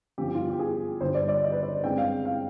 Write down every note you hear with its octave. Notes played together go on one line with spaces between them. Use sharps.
G2 D3 F3 B3 G4
G4
F4
G4
G4
G#4
G1 G2 D3 G3 C5
D5
D5
D#5
B4
D5
G2 D3 G#3 C4 G5
F5
F5